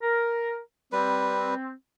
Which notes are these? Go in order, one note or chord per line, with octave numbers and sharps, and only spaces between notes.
A#4
G3 C4 B4